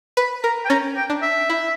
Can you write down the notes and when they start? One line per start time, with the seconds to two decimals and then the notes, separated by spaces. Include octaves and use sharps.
0.17 B4 B5
0.44 A#4 A#5
0.65 G5
0.70 C#4 A#5
0.97 G5
1.10 D4
1.22 E5
1.50 E4